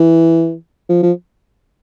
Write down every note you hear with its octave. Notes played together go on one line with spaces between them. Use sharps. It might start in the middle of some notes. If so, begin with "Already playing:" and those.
Already playing: E3
F3
F3